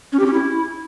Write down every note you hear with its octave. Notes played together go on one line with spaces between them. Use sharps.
C#4
G4
C#4
E4